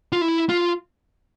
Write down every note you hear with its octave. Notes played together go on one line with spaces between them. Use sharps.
F4
E4
F4